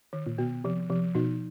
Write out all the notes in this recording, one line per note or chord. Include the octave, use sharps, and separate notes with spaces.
D#3
A#2
B2 B3
C3 F3
C3 F3
B2 D#4